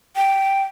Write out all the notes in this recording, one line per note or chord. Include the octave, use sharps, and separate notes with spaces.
G5